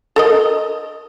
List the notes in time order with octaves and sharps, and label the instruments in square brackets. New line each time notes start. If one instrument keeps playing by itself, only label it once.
[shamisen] A4 A#4 D#5